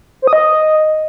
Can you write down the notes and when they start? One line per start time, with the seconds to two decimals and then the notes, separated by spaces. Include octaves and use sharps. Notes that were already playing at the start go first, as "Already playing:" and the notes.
0.22 C5
0.27 D#6
0.33 D#5